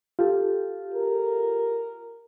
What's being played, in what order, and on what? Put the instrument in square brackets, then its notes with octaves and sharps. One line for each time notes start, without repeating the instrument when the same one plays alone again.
[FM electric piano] F4 G4 A4
[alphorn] A#4